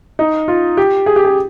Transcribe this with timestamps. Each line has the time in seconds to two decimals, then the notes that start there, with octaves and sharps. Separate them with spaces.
0.19 D#4
0.48 F4
0.77 G4
1.06 G#4
1.16 G4
1.25 G#4